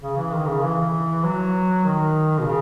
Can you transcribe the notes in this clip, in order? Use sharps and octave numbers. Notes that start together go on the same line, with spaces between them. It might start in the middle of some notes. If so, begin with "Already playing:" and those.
C#3
E3
D#3
C#3
E3
F#3
D#3
B2
C#3